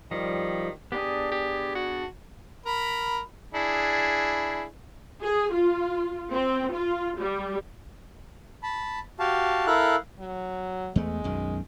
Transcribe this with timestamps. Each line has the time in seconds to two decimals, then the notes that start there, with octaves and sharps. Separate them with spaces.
0.11 D#3 F3 G3
0.92 B3 D4 G4 G#4
1.32 G4
1.75 F#4
2.66 A#4 B5
3.54 D4 E4 G#4
5.22 G#4
5.52 F4
6.31 C4
6.73 F4
7.19 G3
8.63 A5 B5
9.19 F#4 G4 F5 A5
9.67 E4 A4 A#4 F5 F#6
10.19 F#3
10.96 E2 G#3 A3
11.24 B1 F#2 D#3